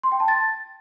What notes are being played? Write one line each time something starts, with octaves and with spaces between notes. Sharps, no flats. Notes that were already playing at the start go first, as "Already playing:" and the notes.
C6
G5
A5
A6